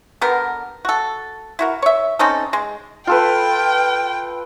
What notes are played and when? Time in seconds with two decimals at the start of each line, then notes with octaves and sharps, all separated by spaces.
0.21 D3 B3 G4 A#4
0.85 F#4 A4
1.59 E4 F#4 A#4
1.82 C#5 E5
2.19 C4 C#4 D#4 A4
2.53 G#3
3.07 F4 A4 B4 G5